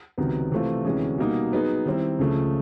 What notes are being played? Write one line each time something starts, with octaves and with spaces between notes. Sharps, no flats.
C#2 C3 D#3 F#3 B3
C3 E3 A3 C4 F4
D2 C3 E3 G#3 C#4
B2 G3 A#3 D#4
F#3 B3 D#4 G#4 B4
D#3 G3 C4 E4
C#2 C#3 F3 A3